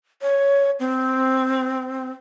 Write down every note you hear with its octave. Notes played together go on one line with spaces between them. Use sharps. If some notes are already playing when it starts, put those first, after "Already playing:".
C#5
C4